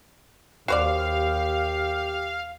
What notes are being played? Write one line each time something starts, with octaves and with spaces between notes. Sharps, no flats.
D#2 F#4 G4 C5 D5 F5